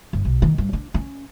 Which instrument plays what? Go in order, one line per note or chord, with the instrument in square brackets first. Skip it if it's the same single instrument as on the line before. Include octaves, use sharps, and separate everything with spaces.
[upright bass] G1
B1
D#3
G2
D4
C#4